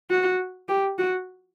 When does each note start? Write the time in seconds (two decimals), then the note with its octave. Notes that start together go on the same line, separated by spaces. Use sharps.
0.11 F#4
0.69 G4
0.98 F#4